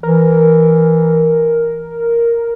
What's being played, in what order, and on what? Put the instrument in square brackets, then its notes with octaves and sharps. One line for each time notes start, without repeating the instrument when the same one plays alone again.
[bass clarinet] E3 [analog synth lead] A#4